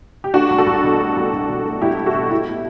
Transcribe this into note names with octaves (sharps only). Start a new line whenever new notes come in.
G4
A3 D4 F#4
C2
F#4 A4
C2
B2
A3
C2
C2
B2
A3
C2 E4 G4
C2
F#4 A4
B2
A3 E4 G4
A2